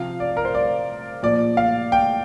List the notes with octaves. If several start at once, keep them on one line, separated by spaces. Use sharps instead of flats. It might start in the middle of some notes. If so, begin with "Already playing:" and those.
Already playing: C3 F3 F5
D5
A#4
C5
D5
A#2 F3 D5
F5
G5